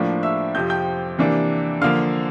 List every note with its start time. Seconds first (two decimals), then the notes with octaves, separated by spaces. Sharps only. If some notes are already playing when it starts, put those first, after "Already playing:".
Already playing: A2 F3 A#3 D4
0.23 E5 E6
0.55 F2 C3 F3 G6
0.70 G5 G6
1.18 C3 E3 A#3 D4
1.82 D3 F3 A#3 F5 F6